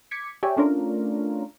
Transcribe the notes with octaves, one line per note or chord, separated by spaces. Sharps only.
D6 G#6 B6 C#7
G4 C#5 D5 E5 G5 G#5
A3 C#4 D4 F4 A#4